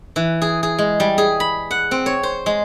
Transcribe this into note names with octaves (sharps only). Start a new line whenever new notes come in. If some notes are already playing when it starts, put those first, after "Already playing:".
E3
G#4
G#4
G#3
G3
G#4
B5
F#5
C4
C#5
C5
G#3